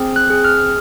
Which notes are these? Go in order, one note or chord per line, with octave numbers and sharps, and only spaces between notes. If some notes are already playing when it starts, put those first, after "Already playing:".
Already playing: C4 G#4
F#6
G#4
F6